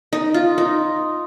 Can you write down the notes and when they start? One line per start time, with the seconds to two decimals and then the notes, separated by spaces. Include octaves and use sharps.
0.13 D#4
0.34 F4
0.58 D#4